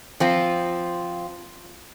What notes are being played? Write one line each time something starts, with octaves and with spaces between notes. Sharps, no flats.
F3 C4 F4